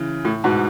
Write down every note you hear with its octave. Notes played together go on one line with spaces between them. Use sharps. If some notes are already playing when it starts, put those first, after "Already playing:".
Already playing: C#3 E3
A2
G#2 B2